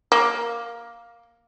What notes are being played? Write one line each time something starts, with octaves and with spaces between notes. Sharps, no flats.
A#3